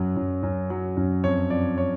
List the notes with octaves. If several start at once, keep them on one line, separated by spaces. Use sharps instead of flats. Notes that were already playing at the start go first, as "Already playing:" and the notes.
Already playing: F#2 F#3
F#2
F#2
F#3
F#2
F2 C#5
F2 D5
C#5